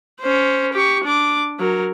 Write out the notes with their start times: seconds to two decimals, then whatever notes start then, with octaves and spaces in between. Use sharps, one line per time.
0.21 C#4 C5
0.73 G4 C#6
1.04 D4 D6
1.59 F#3 A#4